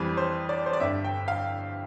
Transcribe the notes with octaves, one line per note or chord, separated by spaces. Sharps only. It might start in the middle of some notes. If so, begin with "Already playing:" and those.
Already playing: F2 E3 G3 B4
C5
D5
C5
D5
G1 G2 D3 E5
G5
F5